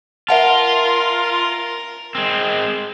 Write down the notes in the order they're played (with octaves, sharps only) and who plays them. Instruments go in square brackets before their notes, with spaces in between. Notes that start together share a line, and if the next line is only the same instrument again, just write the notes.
[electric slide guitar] F4 [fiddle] A#4 [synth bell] E5 F#5 A5
[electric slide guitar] G#3 C4